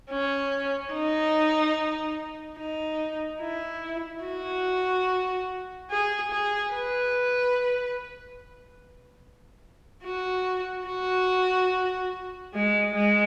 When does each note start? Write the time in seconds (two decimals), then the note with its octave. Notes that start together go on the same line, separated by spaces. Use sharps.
0.11 C#4
0.93 D#4
2.58 D#4
3.41 E4
4.25 F#4
5.90 G#4
6.31 G#4
6.73 B4
10.05 F#4
10.87 F#4
12.54 G#3
12.95 G#3